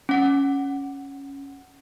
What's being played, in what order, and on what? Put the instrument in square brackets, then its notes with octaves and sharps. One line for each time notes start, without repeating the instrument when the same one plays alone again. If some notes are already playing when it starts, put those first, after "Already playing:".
[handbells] C#4 F#5